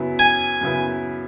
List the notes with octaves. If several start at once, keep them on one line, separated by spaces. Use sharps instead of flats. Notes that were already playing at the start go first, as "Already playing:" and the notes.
Already playing: F#2 C#3 F#3 B3 E4
G#5
F#2 C#3 F#3 B3 E4